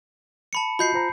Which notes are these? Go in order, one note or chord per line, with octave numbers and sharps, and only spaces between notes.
A5 B5 C#7
F4 F#4 D#5 B5 G6 C7
F4 C5 A#5